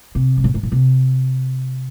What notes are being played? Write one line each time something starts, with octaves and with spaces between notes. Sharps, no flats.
C3
G#2
A2
G#2
A2
C3